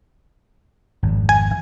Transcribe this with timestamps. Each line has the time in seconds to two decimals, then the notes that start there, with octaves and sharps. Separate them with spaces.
1.03 G#1 F2
1.29 G#5